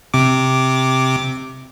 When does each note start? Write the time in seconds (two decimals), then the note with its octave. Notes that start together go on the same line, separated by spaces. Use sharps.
0.14 C3 D6